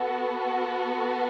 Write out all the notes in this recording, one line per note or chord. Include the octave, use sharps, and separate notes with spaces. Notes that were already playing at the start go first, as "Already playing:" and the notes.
Already playing: B3 F#4 A4